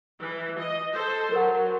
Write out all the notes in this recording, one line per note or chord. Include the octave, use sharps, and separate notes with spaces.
E3
D#5
A4 C5
F#3 A#4 F#5